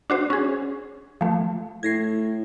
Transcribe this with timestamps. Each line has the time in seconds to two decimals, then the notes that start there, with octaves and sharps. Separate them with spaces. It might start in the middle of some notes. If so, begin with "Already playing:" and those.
0.10 D4 F#4 C5
0.30 C#4 G#4
1.21 F3 A3
1.83 A2 G#6 A#6 C7